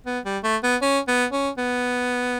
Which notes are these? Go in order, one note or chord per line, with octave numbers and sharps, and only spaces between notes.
B3
G3
A3
B3
C#4
B3
C#4
B3